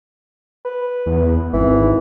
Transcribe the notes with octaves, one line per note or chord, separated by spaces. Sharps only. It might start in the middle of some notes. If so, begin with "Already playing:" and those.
B4
E2
G#1 E3